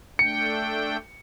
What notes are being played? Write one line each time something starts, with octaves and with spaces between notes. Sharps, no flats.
A3 D4 G5 C#7